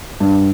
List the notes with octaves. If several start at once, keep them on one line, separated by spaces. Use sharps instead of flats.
G2